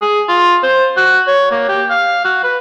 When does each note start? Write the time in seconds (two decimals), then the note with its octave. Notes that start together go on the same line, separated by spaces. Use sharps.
0.02 G#4
0.28 F4
0.63 C5
0.97 F#4
1.27 C#5
1.51 A#3
1.69 G4
1.90 F5
2.24 F#4
2.43 B4